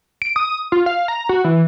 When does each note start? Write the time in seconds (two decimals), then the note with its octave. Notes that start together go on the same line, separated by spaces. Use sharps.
0.22 D7
0.36 D#6
0.72 F4
0.86 F5
1.08 A#5
1.29 F#4
1.44 E3